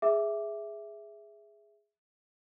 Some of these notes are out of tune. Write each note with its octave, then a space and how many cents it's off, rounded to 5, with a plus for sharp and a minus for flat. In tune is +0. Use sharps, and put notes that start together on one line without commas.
G#4 +0 E5 +0 D6 +0